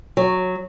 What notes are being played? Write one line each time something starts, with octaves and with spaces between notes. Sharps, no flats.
F#3